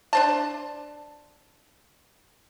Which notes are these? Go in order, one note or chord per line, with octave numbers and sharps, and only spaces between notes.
D4 C5 A5